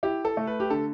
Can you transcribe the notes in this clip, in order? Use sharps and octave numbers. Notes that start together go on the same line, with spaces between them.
E4 G4
A4
A3
B4
G4
D3 A4